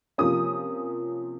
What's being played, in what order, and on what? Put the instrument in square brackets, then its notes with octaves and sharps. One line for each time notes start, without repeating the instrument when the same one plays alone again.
[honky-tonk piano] C3 F3 A#3 C#4 D#6